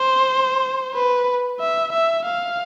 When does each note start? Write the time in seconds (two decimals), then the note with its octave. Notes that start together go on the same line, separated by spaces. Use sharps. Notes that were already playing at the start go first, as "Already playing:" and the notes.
Already playing: C5
0.95 B4
1.60 E5
1.92 E5
2.25 F5